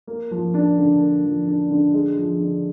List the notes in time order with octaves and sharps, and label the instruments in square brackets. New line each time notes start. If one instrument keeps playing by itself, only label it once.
[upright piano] A#3
F3
D4
D3
A#3
F3
D4
D3
G#3
F3
D3